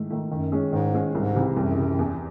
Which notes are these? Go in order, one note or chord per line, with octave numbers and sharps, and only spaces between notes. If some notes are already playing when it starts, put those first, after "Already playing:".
Already playing: G#2 D#3 A3
D#3 A3
F#2 D#3
G#3 C#4 G#4
G#2 D#3
G#3 C#4 G#4
C2 G#2
C3 E3
C2 F#2
C3 E3
E2